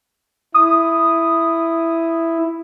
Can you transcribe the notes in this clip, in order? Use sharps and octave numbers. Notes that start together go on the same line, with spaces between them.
E4 D#6